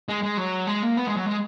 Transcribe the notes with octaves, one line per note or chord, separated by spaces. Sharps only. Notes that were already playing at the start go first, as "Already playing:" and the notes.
G#3
G#3
F#3
G#3
A#3
B3
G#3
F#3
G#3